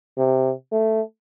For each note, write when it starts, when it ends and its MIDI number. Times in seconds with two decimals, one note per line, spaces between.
0.18 0.52 48
0.72 1.01 57